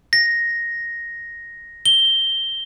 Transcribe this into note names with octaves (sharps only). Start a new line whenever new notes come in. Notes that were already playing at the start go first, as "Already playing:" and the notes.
A#6
G7